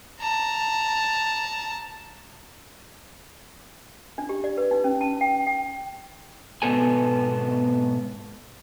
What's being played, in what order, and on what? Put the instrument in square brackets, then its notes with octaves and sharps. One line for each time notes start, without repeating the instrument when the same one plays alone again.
[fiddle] A5 A#5
[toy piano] D4
G4
D5
B4
D#4
C#4
A5
G5
G5
[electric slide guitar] G#2 B2 B3 A4 G#5